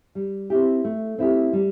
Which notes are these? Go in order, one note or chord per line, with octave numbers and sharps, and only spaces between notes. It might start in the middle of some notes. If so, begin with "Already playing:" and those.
G3
C4 E4 G4
A3
C4 E4 G4
G3